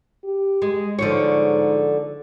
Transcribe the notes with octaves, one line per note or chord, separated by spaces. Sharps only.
G4
G#3
G#2 D3 F3 C#5